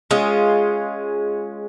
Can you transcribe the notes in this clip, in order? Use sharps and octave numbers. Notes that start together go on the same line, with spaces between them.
G#3 C#4 F4